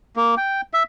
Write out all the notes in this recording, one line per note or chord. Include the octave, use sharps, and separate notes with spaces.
A#3
G5
E5